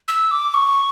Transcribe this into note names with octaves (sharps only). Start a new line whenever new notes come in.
E6
D6
C#6